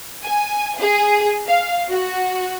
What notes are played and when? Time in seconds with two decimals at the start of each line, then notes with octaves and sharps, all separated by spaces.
0.24 G#5
0.79 G#4
1.46 F5
1.89 F#4